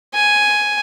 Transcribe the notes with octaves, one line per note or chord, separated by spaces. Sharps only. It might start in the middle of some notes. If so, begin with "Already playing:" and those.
G#5